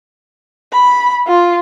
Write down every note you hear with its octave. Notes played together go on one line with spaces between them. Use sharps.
B5
F4